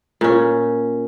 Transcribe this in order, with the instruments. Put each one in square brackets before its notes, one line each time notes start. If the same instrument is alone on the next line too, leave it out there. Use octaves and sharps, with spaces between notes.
[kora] A#2 C#4